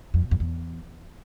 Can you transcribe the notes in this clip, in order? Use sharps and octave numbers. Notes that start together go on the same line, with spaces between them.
F2
B2
F2
E2